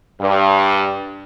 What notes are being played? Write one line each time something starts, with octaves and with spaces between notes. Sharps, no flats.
G2